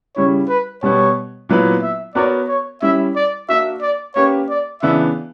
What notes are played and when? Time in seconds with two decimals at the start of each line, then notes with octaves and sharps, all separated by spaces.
0.16 C#3 G3 C#4 E4 C#5
0.49 B4
0.83 B2 G3 B3 C#5
1.49 A#2 F#3 B3 E4 B4
1.82 E5
2.15 B3 F#4 A#4 C#5 D5
2.49 C#5
2.82 G3 C#4 E4 E5
3.16 D5
3.49 A#3 D4 F#4 E5
3.82 D5
4.15 A#3 C#4 G4 B4 C#5
4.50 D5
4.82 C#3 E3 B3 D4 E5